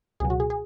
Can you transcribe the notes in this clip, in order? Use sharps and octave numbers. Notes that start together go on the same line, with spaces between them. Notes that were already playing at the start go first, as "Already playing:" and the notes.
C#2 B2 F#3 G#4
F#4
G#4
G#4